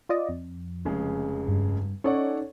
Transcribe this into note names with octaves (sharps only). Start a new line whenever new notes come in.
F4 D5 D#5
F2
F1 C#3 G#3
G2
C#4 D#4 A4 C#5 D5 F#5